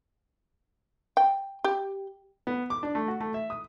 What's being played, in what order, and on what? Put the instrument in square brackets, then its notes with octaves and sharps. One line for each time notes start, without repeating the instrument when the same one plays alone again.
[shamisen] G5
G4
[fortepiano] B3
D6
D4
A3
F#4
A3
E5
D#6